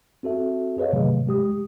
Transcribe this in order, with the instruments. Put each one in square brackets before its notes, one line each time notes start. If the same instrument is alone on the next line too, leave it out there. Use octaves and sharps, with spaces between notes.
[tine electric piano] C4 F#4 A4 E5
G#4 B4 C#5 D#5 F5
G#2 C3 D#3 F#3 A3
G#3 G4 D#6